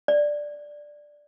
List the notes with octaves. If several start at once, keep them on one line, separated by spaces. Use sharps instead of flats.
D5